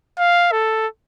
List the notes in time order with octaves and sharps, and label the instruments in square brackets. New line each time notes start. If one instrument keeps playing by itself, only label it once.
[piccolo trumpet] F5
A4